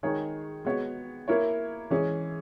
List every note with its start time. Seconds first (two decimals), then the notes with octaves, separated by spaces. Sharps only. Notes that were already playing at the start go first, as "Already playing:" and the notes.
0.03 D#3 G#3 D#4 G#4 C#5
0.65 G#3 B3 F#4 C#5
1.28 A#3 E4 A#4 C#5
1.90 E3 G#3 C#4 G#4